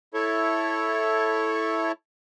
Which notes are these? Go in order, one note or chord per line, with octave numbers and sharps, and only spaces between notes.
E4 A4 C#5